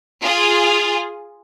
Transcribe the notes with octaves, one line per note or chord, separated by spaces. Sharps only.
F4 G#4